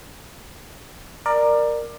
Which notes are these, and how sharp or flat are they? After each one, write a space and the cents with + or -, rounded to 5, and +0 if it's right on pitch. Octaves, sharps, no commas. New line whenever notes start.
A#4 +0 D5 +20